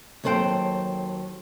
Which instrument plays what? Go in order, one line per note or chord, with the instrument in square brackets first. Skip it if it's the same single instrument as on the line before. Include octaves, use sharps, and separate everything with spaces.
[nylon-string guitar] D#2 F#3 A4 C5 F#5 G5